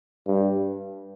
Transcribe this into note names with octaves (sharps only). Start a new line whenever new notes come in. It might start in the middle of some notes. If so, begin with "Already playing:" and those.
G2